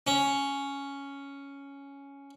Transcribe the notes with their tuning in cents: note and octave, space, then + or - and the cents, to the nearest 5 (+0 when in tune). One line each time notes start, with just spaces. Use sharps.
C#4 +5